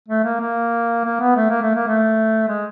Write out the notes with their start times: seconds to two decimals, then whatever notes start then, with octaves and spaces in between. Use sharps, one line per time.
0.08 A3
0.24 A#3
0.40 A#3
1.04 A#3
1.20 B3
1.36 A3
1.50 A#3
1.62 A3
1.75 A#3
1.88 A3
2.48 G#3